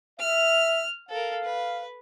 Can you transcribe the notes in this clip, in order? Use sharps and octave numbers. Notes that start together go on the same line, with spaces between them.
E5 F6
A4 A#4 F5
B4